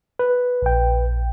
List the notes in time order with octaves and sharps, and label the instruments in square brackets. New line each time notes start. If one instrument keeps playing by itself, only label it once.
[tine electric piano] B4
[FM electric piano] A#1 G5